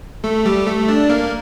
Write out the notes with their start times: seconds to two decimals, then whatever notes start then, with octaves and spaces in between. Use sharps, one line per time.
0.24 A3 A4
0.46 G3 G4
0.66 A3 A4
0.88 D4 D5
1.09 A#3 A#4